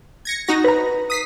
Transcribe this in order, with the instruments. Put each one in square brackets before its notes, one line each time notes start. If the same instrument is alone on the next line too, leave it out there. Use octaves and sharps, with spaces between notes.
[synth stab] G#6 A#6 C#7
D#4 F#4 A#6
[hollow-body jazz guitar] B4 A#5
[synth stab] D#6 B6 C7